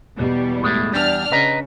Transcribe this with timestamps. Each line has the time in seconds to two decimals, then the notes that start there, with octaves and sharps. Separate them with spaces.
0.17 E2 B2 G3
0.62 A2 G#3 A3
0.94 E2 G3 D4 F6
1.32 C#3 B4 D#5 A#5